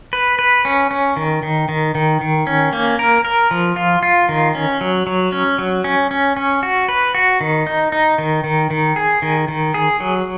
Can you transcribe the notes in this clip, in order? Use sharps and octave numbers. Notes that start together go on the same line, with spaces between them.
B4
B4
C#4
C#4
D#3
D#3
D#3
D#3
D#3
C#4
A#3
A#4
A#4
F3
F4
F4
D#3
C#4
F#3
F#3
C#4
F#3
C#4
C#4
C#4
F#4
B4
F#4
D#3
D#4
D#4
D#3
D#3
D#3
G#4
D#3
D#3
G#4
F#3